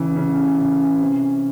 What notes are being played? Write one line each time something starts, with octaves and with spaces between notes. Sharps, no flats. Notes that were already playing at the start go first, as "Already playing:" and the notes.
Already playing: C#3 E3
C#3
C#3
C3